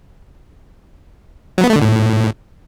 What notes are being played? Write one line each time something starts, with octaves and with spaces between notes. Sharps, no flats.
F#3
B3
A3
D3
A2